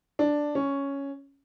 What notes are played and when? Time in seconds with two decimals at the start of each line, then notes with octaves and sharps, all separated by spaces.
0.19 D4
0.55 C#4